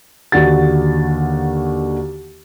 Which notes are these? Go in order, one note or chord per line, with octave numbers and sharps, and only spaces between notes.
D#2 D3 F#4 A6